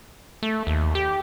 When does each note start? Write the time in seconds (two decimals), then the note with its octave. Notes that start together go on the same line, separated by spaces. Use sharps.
0.43 A3
0.67 D#2
0.95 G4